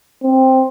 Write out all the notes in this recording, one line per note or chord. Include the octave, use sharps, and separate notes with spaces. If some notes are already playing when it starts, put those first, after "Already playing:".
C4